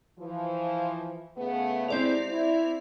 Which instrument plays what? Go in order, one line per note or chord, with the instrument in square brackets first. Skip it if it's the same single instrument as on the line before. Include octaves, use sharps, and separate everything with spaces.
[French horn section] E3 F3
C#3 A3 B3
[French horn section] C3 G#3 E4 [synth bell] C4 D5 F7
[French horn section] E4